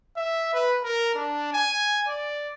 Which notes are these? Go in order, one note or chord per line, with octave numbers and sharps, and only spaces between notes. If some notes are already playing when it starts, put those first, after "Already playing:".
E5
B4
A#4
D4
G#5
D5